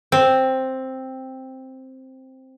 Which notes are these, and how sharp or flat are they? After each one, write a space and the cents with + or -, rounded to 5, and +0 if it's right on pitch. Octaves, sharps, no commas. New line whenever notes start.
C4 +5